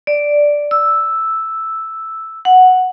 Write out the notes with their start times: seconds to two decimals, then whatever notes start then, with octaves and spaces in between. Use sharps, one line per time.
0.07 D5
0.71 E6
2.45 F#5